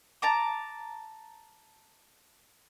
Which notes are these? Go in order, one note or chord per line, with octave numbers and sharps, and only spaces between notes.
A5 A#5 D6